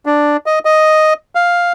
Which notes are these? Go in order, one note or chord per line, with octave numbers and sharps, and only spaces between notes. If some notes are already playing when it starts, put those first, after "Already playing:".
D4
D#5
D#5
F5